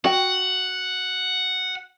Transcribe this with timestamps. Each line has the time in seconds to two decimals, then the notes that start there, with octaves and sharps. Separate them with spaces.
0.04 F#4 F#5 G5